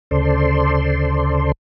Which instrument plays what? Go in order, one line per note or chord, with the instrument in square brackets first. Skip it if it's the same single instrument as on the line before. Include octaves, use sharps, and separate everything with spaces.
[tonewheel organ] D2 C#3 A4 C5 D5 C6